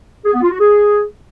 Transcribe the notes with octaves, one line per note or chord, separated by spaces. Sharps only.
G#4
B3
F4
F#4
G#4